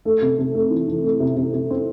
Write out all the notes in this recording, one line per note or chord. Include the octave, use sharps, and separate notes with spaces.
A3
C3
C3
A3
E3
E3
A3
C3
C3
C3
C4